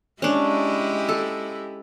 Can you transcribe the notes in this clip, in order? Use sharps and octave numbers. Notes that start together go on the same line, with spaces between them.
G#3 C#4 D4 E4 G4
A4